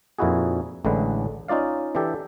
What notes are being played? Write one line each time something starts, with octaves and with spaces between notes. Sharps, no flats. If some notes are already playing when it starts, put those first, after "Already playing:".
F2 A#2 D#4 E4 F#4 G#4
A1 A2 D3 G#3 B4
C#4 D#4 F4 D5 F5
E3 D4 G4 A4